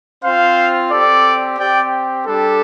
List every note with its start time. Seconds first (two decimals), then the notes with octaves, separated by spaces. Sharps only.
0.24 C4 F4 C5 F5
0.91 C4 G4 A4 D5
1.59 C4 G4 D5 G5
2.27 G3 D4 G4 A4